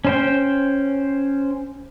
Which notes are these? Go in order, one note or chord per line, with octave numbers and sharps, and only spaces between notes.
C#4 C5 G5